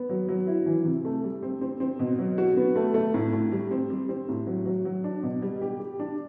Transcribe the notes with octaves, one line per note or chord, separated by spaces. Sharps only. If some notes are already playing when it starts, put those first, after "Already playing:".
Already playing: B3
F#3
F#3
E4
E3
C3
A3
G3
C4
C4
C4
B2
F#3
F#4
B3
A3
A3
A2
A2
G3
C4
G3
C4
A2
F#3
F#3
F#3
D4
B2
G3
G4
G4
D4